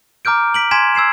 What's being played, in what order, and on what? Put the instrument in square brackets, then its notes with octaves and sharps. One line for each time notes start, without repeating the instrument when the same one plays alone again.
[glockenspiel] A#5 D6 F6 G6 D7
B6 D7 F#7
G#5 C6 G#6 B6 D7 E7
E6 G#6 C7 E7